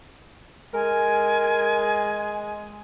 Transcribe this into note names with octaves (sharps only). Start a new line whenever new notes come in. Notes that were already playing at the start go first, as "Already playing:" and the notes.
G#3 A#4 G#5